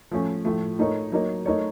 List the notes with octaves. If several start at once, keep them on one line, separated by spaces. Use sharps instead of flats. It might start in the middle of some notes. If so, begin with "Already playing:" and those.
F3 A3 C#4
A2 F3 A3
A3 D#4 A#4 C#5
F#3 A#3 D#4 A#4 C#5
A3 D#4 A#4 C#5